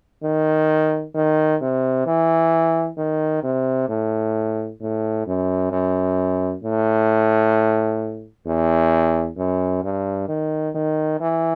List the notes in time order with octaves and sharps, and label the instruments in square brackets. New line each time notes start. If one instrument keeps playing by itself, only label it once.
[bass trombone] D#3
D#3
C3
E3
D#3
C3
A2
A2
F#2
F#2
A2
E2
F#2
G2
D#3
D#3
E3